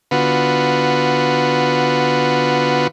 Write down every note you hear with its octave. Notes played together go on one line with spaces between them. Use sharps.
D3 B3 F4 F#4 B4